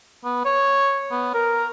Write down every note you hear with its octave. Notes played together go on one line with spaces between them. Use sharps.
B3
C#5
B3
A#4